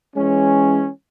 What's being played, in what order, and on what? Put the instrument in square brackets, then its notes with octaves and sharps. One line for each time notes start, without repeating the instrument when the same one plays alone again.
[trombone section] E3 G#3 C#4